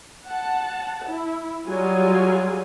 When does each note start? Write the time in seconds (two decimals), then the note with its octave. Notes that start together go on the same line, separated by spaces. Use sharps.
0.25 F#5 A5
1.08 E4
1.69 F#3 G3 F4 G#4 G#5